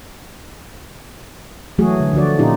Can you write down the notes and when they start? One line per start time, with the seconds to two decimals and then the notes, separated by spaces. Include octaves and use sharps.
1.78 E3 F#3 A3 F#4 G#4
2.00 D3
2.13 D3 F3 F#4 D5
2.39 A#2 C#4 D#4 F4 G4